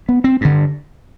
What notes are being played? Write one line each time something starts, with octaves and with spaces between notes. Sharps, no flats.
B3
C4
G2 D3